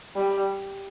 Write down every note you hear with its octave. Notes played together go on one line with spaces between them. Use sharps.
G3